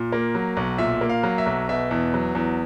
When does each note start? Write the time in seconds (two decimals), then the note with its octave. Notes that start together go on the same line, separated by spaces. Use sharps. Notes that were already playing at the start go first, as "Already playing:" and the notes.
Already playing: A#2
0.12 A#3
0.35 F#3
0.57 B1
0.78 A#2 E5
1.01 A#3
1.09 F5
1.23 F#3
1.38 E5
1.46 B1
1.69 B2 E5
1.91 E2
2.14 F#3
2.35 E2